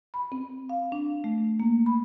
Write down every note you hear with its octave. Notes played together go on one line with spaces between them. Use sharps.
B5
C4
F5
D4
A3
A#3
B5